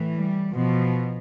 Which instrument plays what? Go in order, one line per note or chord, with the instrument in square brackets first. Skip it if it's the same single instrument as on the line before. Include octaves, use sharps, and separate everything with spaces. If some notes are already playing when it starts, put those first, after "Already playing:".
Already playing: [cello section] A2 E3
G3
B2 F3